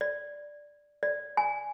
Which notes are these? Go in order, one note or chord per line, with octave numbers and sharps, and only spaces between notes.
D5
D5
G#5